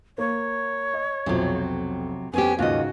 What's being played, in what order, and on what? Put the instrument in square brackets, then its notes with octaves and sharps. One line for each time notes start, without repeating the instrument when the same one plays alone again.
[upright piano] A#3 [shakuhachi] C#5
[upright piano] D#5
[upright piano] B1 F2 F3 [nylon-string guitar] C3 F#3
[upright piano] F2 [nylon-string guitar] B3 C#4 G4 [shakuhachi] G#5
[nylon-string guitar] D#2 D#5 [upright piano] G#2 C#3 F4 [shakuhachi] F#4